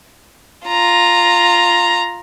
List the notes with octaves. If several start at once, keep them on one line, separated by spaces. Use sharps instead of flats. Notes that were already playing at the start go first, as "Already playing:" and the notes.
F4 A#5